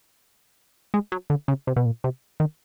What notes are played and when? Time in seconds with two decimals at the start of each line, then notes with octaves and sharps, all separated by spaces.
0.94 G#3
1.12 F#3
1.30 D3
1.48 C#3
1.67 C3
1.76 B2
1.86 A#2
2.04 C3
2.40 D#3